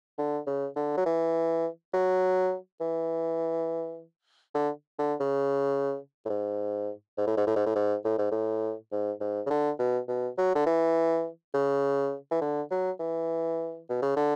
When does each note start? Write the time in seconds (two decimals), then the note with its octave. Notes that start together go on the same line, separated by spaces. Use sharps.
0.18 D3
0.47 C#3
0.76 D3
0.97 F#3
1.06 E3
1.94 F#3
2.81 E3
4.55 D3
4.99 D3
5.20 C#3
6.26 A2
6.30 G#2
7.18 G#2
7.27 A2
7.37 G#2
7.47 A2
7.56 G#2
7.66 A2
7.76 G#2
8.04 A2
8.18 G#2
8.31 A2
8.92 G#2
9.20 G#2
9.46 C#3
9.50 D3
9.79 B2
10.08 B2
10.38 F#3
10.55 D3
10.66 E3
11.54 C#3
12.31 E3
12.42 D3
12.71 F#3
12.99 E3
13.90 B2
14.02 C#3
14.16 D3